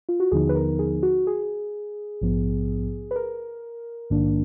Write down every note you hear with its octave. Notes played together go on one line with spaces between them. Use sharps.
F4
F#4
D#2 D3 F3 B3 D#4 G#4
B4
A#4
G#4
F#4
G#4
A#1 G#2 F3 B3
B4
A#4
A#1 G#2 D#3 A#3 D4